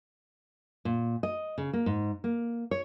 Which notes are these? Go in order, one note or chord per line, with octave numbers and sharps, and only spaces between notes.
A#2
D#5
C#3
A#3
G#2
A#3
C#5